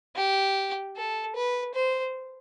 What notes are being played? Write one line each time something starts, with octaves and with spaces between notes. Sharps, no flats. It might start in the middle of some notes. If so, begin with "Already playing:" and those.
G4
A4
B4
C5